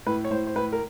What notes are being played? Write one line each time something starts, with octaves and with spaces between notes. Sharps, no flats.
A2 B4
C#5
A2 C5
C5
A2 B4
A#4